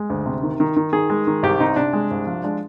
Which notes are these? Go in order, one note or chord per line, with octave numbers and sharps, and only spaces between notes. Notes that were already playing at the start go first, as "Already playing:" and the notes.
Already playing: G#3
D2
C3
D#3
D#3
D#3
D#3 G#4
G#3
D#3
C2 G4
C3 D#4
C3 D4
G#3
C2
F3
G#3 D4